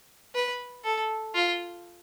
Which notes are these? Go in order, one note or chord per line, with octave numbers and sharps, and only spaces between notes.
B4
A4
F4